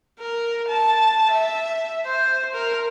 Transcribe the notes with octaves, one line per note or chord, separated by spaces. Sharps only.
A#4
A5
E5
C5
A#4